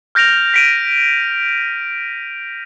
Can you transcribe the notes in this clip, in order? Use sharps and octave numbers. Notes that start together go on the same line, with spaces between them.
F6 G6 A#6 D7 F7
B6 D7 D#7